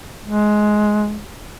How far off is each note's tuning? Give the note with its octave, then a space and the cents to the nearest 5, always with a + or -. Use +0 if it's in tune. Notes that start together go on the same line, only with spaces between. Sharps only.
G#3 +15